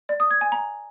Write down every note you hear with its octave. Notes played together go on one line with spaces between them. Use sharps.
D5
D#6
G#6
G#5
A#5